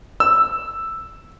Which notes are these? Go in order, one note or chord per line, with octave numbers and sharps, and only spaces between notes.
E6